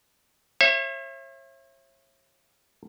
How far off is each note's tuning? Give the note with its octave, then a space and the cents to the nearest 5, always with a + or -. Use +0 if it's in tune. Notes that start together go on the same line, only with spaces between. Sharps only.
C#5 -40 E5 +20